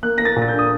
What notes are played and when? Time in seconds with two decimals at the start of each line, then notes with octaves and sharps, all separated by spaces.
0.03 A#3 F#6
0.18 A#3 A#6
0.25 A6
0.36 A#2
0.42 A6
0.48 G6
0.53 D4
0.59 D#6